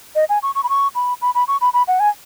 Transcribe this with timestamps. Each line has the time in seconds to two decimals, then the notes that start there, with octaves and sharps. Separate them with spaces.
0.15 D#5
0.29 G#5
0.43 C#6
0.55 C#6
0.63 B5
0.69 C#6
0.95 B5
1.22 B5
1.35 B5
1.48 C#6
1.61 B5
1.74 B5
1.88 F#5
2.00 G#5